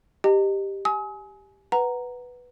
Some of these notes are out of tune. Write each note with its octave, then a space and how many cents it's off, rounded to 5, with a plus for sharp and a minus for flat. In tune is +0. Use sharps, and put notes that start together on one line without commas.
G4 +0 D#5 -20 A#5 -40
G#5 +20 D#6 +40
B4 +0 F#5 +0 A#5 +0